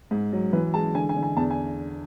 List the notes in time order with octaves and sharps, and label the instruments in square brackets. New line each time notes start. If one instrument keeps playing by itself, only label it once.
[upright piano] G#2
F#3
E3 B4
G#3 A5
D3 G#5
G#5
D3
G#5
E2 A5
G#5